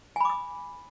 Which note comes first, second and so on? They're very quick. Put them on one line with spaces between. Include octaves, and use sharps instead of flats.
G#5 B5 D6 D#6